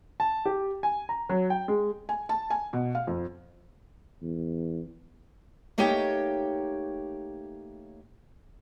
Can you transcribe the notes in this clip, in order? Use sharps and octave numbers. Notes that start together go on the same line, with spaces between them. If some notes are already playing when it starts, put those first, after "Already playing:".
A5
G4
G#5
A#5
F#3
G5
G#3
G#5
A5
G#5
B2
F5
F2
E2
A3 A#3 D#4 G4 C#5 G5